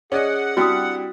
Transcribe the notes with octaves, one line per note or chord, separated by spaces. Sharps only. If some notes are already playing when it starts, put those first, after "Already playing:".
C#4 G#4 D5 D#5 F#5
G3 C4 D4 E4 F#4 D#6